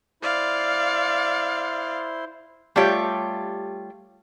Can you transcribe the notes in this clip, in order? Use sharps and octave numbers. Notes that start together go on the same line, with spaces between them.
E4 C5 D5 F5 C6
G3 A3 F4 G4 C#5